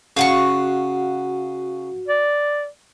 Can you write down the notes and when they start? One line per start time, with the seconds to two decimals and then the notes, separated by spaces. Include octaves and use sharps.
0.17 C#3 F#4 F5 F#5 C#6
2.08 D5